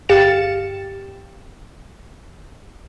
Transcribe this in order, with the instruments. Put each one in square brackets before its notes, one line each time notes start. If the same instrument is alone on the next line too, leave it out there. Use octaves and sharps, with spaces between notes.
[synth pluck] G1 G4 F5 A6 C#7 E7